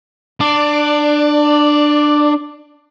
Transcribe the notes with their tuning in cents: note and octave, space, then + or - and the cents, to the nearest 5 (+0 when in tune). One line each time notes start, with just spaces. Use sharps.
D4 +20 D5 +0